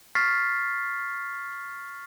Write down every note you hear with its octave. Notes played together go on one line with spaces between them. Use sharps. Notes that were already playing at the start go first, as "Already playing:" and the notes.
C#6 F6 A6 B6 C7